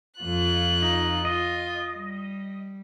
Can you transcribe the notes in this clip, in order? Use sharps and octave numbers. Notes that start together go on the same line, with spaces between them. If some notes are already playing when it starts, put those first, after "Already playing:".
F2 F4 F#6
D#4
F4 D#5
G3